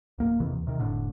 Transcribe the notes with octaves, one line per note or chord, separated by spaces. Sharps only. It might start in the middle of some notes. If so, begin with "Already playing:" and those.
D1 A#3
F2 C3 D#3 E3
D#2
C3 D#3
F1 A2 D3